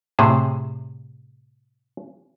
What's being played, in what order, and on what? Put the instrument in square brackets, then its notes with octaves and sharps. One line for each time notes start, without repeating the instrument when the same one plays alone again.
[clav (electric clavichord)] A2 C3 G#4 C5